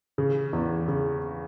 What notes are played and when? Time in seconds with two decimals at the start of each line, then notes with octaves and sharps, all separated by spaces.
0.18 C#3
0.53 E2
0.88 C#3